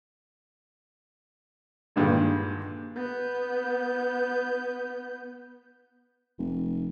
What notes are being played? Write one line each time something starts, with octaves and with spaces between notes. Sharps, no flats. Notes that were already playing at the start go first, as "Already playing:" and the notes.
G2 A#2 D3 D#3 G3 G#3
B3 G6
F1